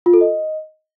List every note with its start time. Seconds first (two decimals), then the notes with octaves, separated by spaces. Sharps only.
0.06 F4
0.14 A4
0.21 D#5